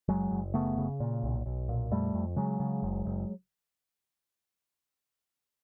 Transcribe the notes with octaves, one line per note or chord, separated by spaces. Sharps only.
F#1 F#3 G#3
F#1
C#3 A3 B3
C#3
A#2
B1
B1
A#2
F2 G3 A3
F2
C#3 F#3 G#3
C#3
F#1
F#1